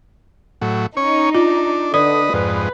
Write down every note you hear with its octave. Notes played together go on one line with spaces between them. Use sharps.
A2 F#3
C#4 D#4 C#5
D4 F4
D3 B4 D5 D#5 D#6
F2 G#2 B4